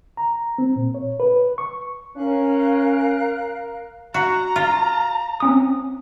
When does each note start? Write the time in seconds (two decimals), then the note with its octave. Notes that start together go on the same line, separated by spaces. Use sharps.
0.17 A#5
0.58 C4
0.76 A#2
0.94 C#5
1.20 B4
1.58 C#6
2.16 C#4 A#4 F5 F#6
4.14 F#4 A#5
4.56 F4
5.40 C4 C#4 D#6